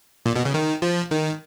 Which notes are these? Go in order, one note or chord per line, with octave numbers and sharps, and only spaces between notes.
A#2
B2
C#3
D#3
F3
D#3